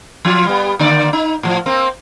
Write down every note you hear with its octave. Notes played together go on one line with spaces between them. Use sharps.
F3 F4
G3 B3
D3 A#3 D5
D#4
A2 F3
A#3 C4